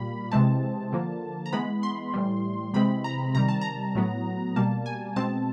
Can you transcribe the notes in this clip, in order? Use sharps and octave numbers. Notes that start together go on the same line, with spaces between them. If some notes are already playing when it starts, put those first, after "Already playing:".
Already playing: A#2 G3 A#3 B5
C3 E3 G#3 C4 A5
D3 F3 A#3
A#5
E3 G#3 B3 B5
C6
A2 E3 G3
C3 E3 G#3 C4 B5
A#5
C3 D#3 G3 A#5
A5
A#5
A2 F#3 B3
B2 G3 A#3 A5
G#5
B2 G#3 C4 A5